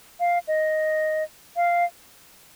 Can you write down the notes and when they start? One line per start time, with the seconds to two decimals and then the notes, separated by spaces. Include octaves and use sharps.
0.20 F5
0.48 D#5
1.56 F5